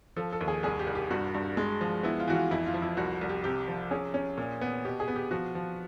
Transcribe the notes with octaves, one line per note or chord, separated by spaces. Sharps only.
F3 A4
A4
D#2
G#4
C2 G#4
G4
C2
G4
G2 F#4
G2
G#3
F3
B3 E4
F4
E3 F#4
F4
F2 E4
F4
F3
E4
C2 F#4
C2
G4
C3 G4
F3
C#4 G#4
C#4
A#2
B3
B2 G4
G#4
B3
G4
F3 F#4
F3